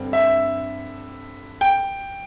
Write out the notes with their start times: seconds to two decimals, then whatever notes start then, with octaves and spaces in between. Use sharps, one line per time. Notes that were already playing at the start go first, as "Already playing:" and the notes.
Already playing: G2 D3 C4
0.13 E5
1.61 G5